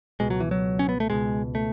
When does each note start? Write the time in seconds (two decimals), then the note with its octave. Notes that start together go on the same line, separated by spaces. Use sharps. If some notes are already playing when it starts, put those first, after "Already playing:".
0.20 C#2 B2 G#3
0.30 F#3
0.40 E3
0.51 F#3
0.79 C#4
0.89 B3
1.00 A3
1.10 C#2 B2 G#3
1.55 A3